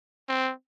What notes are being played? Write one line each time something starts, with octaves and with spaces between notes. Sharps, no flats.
C4